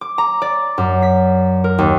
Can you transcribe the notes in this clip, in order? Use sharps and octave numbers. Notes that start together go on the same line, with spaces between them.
D6
A#5
D5
F#2
B6
A#4
D#2